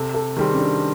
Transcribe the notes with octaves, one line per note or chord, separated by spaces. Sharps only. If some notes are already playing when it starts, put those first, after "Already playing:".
Already playing: C3 A4
A4
D#3 G3 C4 G#4
C#4
D4